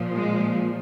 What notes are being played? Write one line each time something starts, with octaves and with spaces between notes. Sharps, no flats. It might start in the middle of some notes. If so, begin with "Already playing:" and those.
Already playing: A#2 F3
G#3